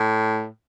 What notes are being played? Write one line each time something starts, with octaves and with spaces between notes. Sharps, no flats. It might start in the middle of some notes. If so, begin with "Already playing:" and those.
Already playing: A2